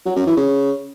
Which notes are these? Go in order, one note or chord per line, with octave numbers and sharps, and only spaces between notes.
F#3
F#2
E3
C#3